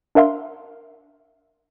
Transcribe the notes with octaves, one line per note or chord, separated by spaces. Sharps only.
D4 A#4 E5 F5 C6